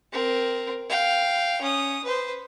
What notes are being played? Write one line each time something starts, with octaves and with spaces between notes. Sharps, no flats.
C4 A#4
F5 G5
C#4 D#6
B4 C5